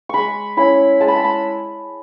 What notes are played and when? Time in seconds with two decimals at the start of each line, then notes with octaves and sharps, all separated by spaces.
0.09 G#3 B5 C#6
0.57 C#4 E4 B5
1.00 G#3 A5
1.08 B5
1.16 A5
1.24 B5